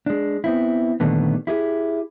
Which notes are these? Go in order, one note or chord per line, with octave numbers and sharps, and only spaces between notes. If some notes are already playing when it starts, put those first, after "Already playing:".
G#3 D4
B3 C4 E4
A#2 D3 D#3 G3 A3 B3
E4 G4 G#4